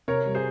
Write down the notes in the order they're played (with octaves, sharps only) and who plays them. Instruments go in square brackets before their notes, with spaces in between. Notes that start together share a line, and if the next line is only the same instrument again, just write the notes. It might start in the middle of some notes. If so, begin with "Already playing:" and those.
[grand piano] C3 [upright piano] A#4 C#5
[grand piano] G3
[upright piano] G#4 C5